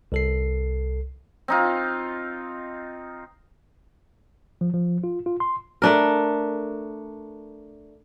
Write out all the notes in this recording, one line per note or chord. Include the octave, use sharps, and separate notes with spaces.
C2 A4 C7
C4 D#4 F4
F3
F3
F4
F4
C6
A3 D4 A#4